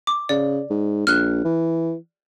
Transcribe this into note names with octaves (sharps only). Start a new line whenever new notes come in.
D6
C#3 D5
G#2
A#1 F6 F#6
E3